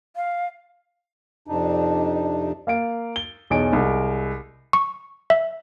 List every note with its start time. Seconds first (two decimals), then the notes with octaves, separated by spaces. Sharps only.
0.16 F5
1.47 F2 C3 D4 D#4
2.67 A#3 F5 D7
3.16 G7
3.50 B1 E2 G#4 C#5 D#5 D7
3.73 C2 G#3
4.73 C#6
5.30 E5